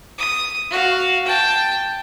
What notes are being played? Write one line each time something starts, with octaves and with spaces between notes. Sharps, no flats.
D#6
F#4 F5
G5 A5